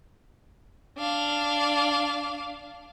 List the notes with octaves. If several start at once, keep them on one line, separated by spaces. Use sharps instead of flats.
D4 F5